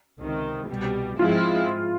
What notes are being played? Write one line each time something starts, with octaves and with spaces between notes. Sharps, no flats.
C#2 C3 D#3
C2 B2 G3
G#2 F3 G#3 C4 E4 F4